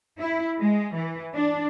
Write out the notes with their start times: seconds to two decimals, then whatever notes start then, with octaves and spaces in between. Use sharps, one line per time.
0.19 E4
0.60 G#3
0.95 E3
1.34 D4